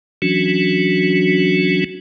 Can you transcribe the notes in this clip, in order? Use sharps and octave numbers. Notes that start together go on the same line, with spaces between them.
E3 F#3 C#4 D4 F#4